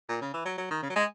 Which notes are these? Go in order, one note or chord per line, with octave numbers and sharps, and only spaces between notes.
A#2
C#3
E3
F#3
F#3
D#3
C#3
F#3
G#3